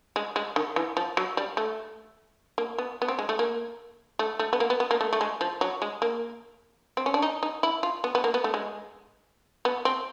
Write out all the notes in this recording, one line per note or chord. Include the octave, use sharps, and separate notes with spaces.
G#3
G#3
D#3
E3
F3
F#3
G3
A3
A#3
B3
B3
C4
G#3
A3
A#3
A3
A3
B3
A#3
B3
B3
A#3
A3
A3
G#3
F3
F#3
G#3
A#3
C4
C#4
D4
D#4
D#4
E4
F4
B3
B3
A#3
B3
A3
G#3
B3
C4